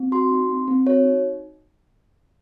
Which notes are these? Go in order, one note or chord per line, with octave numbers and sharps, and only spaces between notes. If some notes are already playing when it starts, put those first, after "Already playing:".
Already playing: C4
F#4 C6
D#4
C4
C4
F#4 C#5
D#4